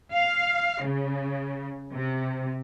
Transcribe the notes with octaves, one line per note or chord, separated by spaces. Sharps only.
F5
C#3
C3